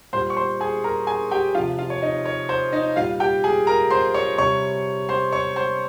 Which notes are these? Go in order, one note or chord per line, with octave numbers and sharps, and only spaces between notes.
A#2 G3 C5 C6
C#6
C5 C6
G#4 G#5
A#4 A#5
G#4 G#5
G4 G5
C3 F3 F4 F5
F4 F5
C#5
D#4 D#5
C#5
C5
D#4 D#5
A#2 G3 F4 F5
G4 G5
G#4 G#5
A#4 A#5
C5 C6
C#5 C#6
C3 G3 C#5 C#6
C5 C6
C#5 C#6
C5 C6